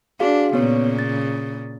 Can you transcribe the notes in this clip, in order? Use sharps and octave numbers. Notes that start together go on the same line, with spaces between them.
D4 F#4 G#4 F5
A#2 C#3 B3 C#5
A6